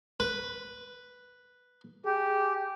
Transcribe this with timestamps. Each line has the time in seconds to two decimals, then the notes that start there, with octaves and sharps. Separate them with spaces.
0.20 B4
2.05 G4 G#4